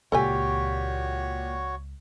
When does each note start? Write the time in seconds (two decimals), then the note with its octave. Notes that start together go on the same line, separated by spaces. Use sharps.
0.12 C#2 A#2 F#4 G4 A4 C#5 D#5 G#5